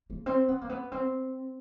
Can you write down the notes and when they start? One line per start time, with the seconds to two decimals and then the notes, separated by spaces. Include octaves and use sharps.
0.10 A#3
0.26 C4
0.48 B3
0.61 A#3
0.69 B3
0.92 C4